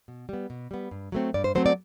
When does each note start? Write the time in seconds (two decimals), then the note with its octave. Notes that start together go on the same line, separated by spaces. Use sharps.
0.08 B2
0.29 G3 B3
0.50 B2
0.71 G3 B3
0.91 G2
1.12 F#3 A3 C4
1.34 G2 D5
1.44 C5
1.55 F#3 A3 C4 C5
1.66 D5